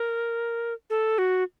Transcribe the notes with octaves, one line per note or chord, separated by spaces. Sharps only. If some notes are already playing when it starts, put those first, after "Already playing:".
Already playing: A#4
A4
F#4